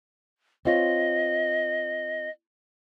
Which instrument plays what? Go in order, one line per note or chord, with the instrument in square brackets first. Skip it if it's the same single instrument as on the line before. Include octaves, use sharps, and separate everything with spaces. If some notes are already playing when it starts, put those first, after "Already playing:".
[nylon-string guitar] C4 F4 C#5 [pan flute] D#5